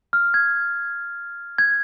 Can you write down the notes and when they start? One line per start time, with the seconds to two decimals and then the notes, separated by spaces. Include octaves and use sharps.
0.13 F6
0.34 G#6
1.58 G#6